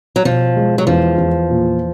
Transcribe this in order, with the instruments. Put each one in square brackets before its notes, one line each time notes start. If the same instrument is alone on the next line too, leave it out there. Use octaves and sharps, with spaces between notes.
[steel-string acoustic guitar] F#3
[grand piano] B2 [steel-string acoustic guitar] F3
[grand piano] G#3
[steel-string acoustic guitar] F#3
[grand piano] E2 [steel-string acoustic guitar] F3
[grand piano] E2
A#2